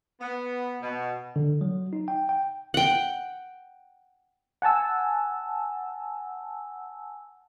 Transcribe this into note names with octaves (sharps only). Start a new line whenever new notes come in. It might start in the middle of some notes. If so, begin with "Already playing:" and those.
B3
B2
D3
F#3
D#4
G5
G5
F#5 G5
F#5 G#5 A5 E6